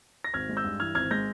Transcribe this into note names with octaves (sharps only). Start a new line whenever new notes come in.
A#6
G#1 F6 G#6
G#3
E6 G6
G2
E3 F6 G#6
G#1 F6 G#6
G#3 G6 A#6